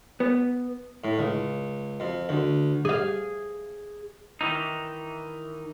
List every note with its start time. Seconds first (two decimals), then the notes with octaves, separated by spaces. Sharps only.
0.20 B3
1.04 A2
1.19 C#2
2.00 F2
2.29 D2
2.85 G#4 F5
4.41 D#3 E3 D#4